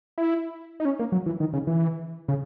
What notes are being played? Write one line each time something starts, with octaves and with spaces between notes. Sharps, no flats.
E4
D#4
C#4
A#3
F#3
E3
D#3
C#3
E3
C#3